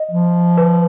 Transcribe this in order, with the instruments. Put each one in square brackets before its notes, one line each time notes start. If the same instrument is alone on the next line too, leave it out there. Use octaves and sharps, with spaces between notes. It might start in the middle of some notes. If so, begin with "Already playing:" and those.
Already playing: [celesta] D#5
[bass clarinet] F3
[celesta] B4